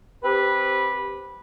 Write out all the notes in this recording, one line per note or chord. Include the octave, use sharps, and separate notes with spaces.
C4 G4 B4